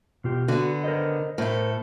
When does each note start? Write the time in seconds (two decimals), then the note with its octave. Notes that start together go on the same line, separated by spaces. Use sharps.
0.24 B2 F4 G4
0.48 D3 B3 F#4
0.84 A#4 C5 D#5
1.38 A2 A4 A#4 C5 E5